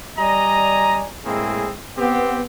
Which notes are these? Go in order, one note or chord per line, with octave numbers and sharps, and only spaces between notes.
G3 D5 D#5 G#5 A#5
A2 G#3 A#3 C4 E4 G#4
B3 C4 G4